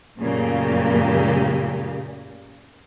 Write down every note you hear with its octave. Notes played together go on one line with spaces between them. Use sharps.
F#2 A#2 C#3 A3 A#3 G4